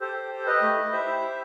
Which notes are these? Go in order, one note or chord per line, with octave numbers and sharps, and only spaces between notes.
G4 A4 C5
G4
G4
G4 B4 D#5
A3
E4
G4 C5 E5
E4
G4